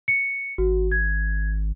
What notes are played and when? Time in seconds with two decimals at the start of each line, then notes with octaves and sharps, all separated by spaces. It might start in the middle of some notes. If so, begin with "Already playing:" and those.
0.08 C#7
0.58 G#1 F#4
0.92 G#6